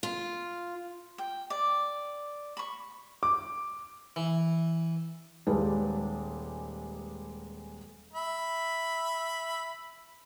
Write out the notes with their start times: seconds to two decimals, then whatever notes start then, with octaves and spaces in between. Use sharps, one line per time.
0.03 F4
1.18 G5
1.50 D5
2.57 B5 C#6
3.23 D6
4.16 E3
5.47 D#1 G3 G#3 B4 A5
8.13 E5 B5